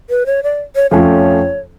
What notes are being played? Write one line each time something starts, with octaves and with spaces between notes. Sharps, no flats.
B4
C#5
D5
C#5
F2 F3 A3 C#4 C#5